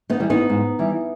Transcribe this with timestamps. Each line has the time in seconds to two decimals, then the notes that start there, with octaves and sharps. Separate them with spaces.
0.10 B3 D#4
0.20 E3 G3
0.30 B3 D#4
0.50 G#2
0.79 E3 G3